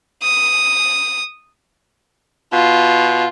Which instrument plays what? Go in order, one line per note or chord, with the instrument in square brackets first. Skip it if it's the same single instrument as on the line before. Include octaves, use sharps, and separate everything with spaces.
[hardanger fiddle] D#6
[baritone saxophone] B2 [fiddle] F4